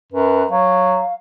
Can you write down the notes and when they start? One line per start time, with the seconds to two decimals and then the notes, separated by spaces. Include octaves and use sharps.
0.13 F#2 B4
0.50 F#3 F5